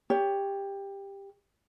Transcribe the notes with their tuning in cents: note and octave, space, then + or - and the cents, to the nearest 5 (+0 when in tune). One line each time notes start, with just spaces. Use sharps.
G4 +15 C#5 +25